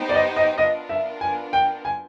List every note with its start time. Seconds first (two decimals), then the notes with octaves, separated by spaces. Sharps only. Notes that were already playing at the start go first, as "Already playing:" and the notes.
Already playing: B3 D#4 G4 C5
0.09 D5
0.15 D#5
0.37 D#5
0.57 B3 D4 F4 A#4 D#5
0.89 E5
1.21 G#5
1.53 G5
1.85 G#5